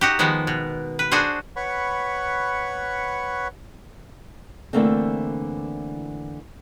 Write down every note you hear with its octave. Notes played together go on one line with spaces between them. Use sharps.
D#4 F#4 G4
D#3 F3 G#3 B3
B2
B4
D4 F#4 G#4 C5
B4 C#5 F#5 B5 C#6
D3 E3 A3 A#3 C4